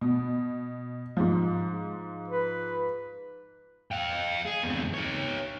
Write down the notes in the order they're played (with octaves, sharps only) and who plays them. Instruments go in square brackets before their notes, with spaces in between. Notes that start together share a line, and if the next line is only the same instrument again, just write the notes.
[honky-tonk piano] B2
G#2 F3
[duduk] B4
[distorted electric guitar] F5 G5
G#4
E2 C3
D#4 C#5